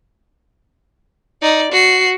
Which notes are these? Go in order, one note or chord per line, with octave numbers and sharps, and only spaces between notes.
D#4 D5
F#4 C7